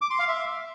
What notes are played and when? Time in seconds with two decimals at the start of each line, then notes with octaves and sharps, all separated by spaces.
0.01 D6
0.10 C6
0.19 F5
0.28 E5